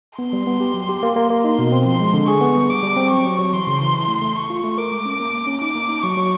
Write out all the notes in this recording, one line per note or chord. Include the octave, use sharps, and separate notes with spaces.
B3 C6
G3
B3
G4
F#3
G4
A#3
A#3
A#3
D#4 C6
B2
C4
F3 C6
G#3
D3
G#4 C#6
B3
G3
G3 D6
G3
C4
F#3 C#6
F#3
F#3
E3 C6
C#3
E3
E4
A3
A3
A3 C#6
F4
A3
A#4 D6
G#3
C#4
A#3
A#3
C#4
D#4 D6
A#3
D#4
F#3 C#6
F#3